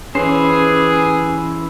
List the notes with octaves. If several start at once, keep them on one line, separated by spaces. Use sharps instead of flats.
E3 C#4 G4 G#4 B4 C5